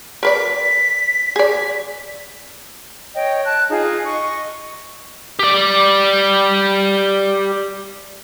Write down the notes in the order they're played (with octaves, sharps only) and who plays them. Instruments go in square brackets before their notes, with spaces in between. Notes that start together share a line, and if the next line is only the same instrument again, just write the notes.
[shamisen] A#4 B4 D5 [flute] B6
[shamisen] G#4 D5
[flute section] C#5 D#5 G5
A5 F#6
D#4 F4 G#4
D#5 C#6
[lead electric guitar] G4 D5